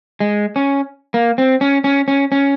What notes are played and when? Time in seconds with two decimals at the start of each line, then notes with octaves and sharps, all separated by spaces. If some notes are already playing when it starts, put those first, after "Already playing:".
0.20 G#3
0.56 C#4
1.14 A#3
1.38 C4
1.61 C#4
1.84 C#4
2.08 C#4
2.32 C#4